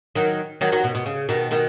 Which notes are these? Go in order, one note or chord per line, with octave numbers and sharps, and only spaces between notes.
D#3 F#3
D#3 F#3
D#3 F#3
B2
B2
C#3
B2 D#3
B2 D#3